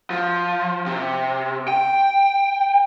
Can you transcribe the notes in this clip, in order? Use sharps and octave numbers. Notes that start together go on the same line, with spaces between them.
F3
C3
G5